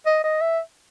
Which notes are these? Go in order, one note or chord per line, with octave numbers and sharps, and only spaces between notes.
D#5
D#5
E5